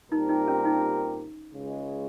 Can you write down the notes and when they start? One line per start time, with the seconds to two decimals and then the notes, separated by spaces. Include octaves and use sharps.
0.11 A#2 G3 C4 D#4 G4 A#4
0.29 D#4
0.48 C#4
0.66 D#4
1.55 C#2 C#3 G#3